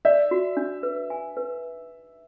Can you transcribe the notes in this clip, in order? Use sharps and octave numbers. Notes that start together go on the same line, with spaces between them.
D5 E5
F#4
D4
B4
G#5
B4